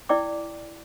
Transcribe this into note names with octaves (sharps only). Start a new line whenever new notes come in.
E4 D5 G5 D6